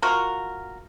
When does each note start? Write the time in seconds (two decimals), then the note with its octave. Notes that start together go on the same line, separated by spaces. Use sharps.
0.02 F4 F#4 A#4